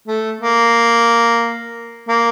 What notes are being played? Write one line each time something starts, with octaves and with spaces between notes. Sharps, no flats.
A3
A#3
A#3